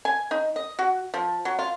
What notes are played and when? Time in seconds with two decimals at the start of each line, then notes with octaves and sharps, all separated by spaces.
0.05 G#5
0.31 D#4
0.56 D#5
0.79 F#4
1.14 F3
1.45 F#3
1.59 F4